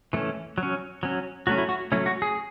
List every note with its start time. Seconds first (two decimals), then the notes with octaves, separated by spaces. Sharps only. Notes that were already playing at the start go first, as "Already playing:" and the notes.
0.13 E3 A3 C#4
0.58 F#3
0.63 C#4
1.03 F#3 C#4
1.47 F#3 A3 C#4 F#4
1.58 E4
1.69 F#4
1.92 F#3 A3 C#4 E4
2.06 F#4
2.22 G#4